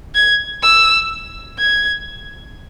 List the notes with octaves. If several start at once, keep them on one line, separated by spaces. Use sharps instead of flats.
G#6
E6
G#6